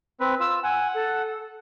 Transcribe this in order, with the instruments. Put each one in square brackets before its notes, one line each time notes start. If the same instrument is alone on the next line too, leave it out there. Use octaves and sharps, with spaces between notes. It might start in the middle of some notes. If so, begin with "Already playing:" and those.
[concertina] C4 B4
[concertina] F4 [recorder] E6
[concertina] F#5 [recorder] G#5
[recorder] A4